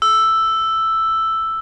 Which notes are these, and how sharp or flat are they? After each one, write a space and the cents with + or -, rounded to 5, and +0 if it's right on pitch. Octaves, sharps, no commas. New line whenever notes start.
E6 +5